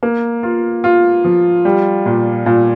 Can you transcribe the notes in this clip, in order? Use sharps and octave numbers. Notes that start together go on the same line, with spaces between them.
A#3
F4
F4
F3
G3
A#2
A#2